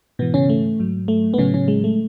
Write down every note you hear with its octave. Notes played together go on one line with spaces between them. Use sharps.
G#2 B2 E3 B3
C#3 C#4
A3
G#2 F#3
A3
B3
A2 C#3 F#3 C#4
C#3 C#4
G#3
A3